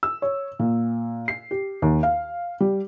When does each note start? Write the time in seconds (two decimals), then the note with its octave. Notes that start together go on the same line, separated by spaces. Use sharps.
0.03 E6
0.22 C#5
0.59 A#2
1.28 C7
1.51 G4
1.82 D#2
2.03 F5
2.60 G3